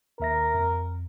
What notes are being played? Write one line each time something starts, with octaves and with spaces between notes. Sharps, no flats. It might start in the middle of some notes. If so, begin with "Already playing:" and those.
D#2 A#4 E5 A#6
F2